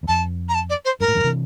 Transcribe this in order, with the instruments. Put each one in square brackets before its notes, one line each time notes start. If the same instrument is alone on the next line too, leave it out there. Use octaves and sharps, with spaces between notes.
[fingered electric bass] E2
[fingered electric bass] F2 [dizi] A5
[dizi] A#5
A5
D5
C5
[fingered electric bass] G2 [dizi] A#4
[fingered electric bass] A2
E2 G2
C3 E3